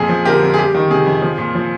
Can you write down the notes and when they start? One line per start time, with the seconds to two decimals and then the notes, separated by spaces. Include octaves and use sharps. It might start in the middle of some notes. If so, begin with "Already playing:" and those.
Already playing: F2 A#2 G#4
0.09 F3
0.25 D3 G4 A#4
0.43 F2
0.54 G#4
0.58 G3 G4
0.75 D#3
0.90 C3 G#4
1.06 F2
1.22 F3
1.38 A#2
1.55 F3